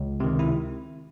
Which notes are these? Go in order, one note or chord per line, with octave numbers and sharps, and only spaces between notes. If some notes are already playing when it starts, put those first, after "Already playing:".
Already playing: C#2
C3 D#3
E4